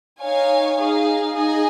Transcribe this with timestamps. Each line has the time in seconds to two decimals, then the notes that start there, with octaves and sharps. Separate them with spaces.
0.21 D#4 C#5 F5 G#5
0.78 D#4 G#4 F5
1.35 D#4 G#4 D#5 G#5